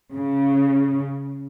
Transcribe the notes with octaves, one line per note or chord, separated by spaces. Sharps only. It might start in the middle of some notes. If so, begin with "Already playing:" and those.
C#3